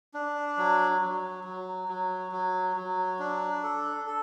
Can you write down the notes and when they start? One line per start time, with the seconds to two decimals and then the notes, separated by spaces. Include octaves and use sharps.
0.14 D4
0.58 F#3
1.01 F#3
1.44 F#3
1.88 F#3
2.32 F#3
2.76 F#3
3.19 D4
3.63 A4
4.07 A4